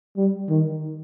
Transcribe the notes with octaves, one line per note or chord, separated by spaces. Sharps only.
G3
D#3